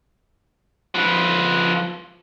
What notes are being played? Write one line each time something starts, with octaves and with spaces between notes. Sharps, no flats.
F3 B4